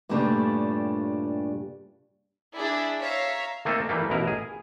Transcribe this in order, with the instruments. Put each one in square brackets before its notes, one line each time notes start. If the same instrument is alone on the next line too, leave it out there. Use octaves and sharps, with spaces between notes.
[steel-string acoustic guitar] G2 A#2 C#3 G3 A3 D4
[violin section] D4 E4 G#4 D5
C#5 E5 F5 A#5
[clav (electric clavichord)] A3 A#3 C4 D#4 A4
E3 G3 A3 A#3
A1 B2 E4 A#4
G#4